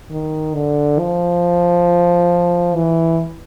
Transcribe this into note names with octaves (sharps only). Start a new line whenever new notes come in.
D#3
D3
F3
E3